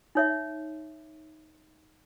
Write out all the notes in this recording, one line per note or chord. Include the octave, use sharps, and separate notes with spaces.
D#4 C#5 E5